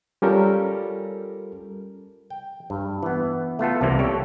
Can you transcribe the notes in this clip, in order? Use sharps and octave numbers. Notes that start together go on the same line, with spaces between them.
G3 C#4 F4 G4 A4 A#4
G5
G2
E3 B3
A3 B3 F4 A4
C2 C3 E3 A#3
G4 A4 C#5